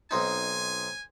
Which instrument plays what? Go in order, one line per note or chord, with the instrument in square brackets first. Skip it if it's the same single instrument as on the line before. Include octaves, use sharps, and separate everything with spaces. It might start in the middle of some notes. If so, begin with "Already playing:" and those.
[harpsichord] B1 C4 D#4 [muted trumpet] G#5